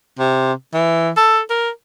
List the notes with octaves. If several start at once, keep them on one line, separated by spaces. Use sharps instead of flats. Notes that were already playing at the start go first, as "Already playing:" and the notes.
C3
E3
A4
A#4